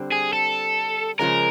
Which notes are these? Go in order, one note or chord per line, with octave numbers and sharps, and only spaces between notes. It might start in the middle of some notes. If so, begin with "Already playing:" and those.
Already playing: D3 G3 C4
G#4
A4
C#3 F3 G#3 C#4 A#4